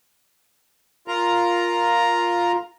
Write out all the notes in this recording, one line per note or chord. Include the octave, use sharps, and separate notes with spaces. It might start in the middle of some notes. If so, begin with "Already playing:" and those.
F4 A#4 A#5